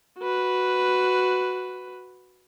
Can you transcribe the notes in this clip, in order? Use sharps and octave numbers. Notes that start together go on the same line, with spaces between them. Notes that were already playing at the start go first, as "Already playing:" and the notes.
F#4 B4